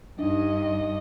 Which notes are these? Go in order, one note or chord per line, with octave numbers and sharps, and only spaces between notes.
G2 D4 D#4 D#5